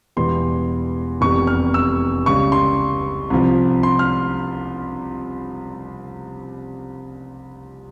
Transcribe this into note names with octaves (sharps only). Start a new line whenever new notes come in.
E1 E2 E3 G3 C6
F1 E2 C3 G3 C#6
F6
E6
C#2 C#3 G3 C#6
C6
C2 C3 F3
C6
F6